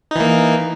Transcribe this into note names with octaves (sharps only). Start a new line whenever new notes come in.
E3 A#3 D#4